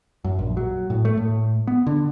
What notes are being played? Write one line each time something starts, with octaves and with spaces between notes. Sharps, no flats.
F#2
A#1
F#3
A2
A3
A2
B3
D3